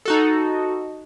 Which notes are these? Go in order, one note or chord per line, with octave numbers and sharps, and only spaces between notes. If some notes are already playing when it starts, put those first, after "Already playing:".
D#4 F#4 A4